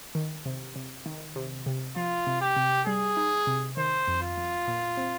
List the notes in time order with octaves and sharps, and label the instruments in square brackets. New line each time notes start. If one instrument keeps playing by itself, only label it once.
[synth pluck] D#3
C3
C3
D#3
C3
C3
[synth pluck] F3 [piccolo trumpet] F4
[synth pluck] C3
[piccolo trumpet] G4
[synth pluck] C3
[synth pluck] G3 [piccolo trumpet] G#4
[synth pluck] D#4
C3
[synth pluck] D#3 [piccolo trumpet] C5
[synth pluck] F2
[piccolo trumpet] F4
[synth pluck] F2
A#2
C4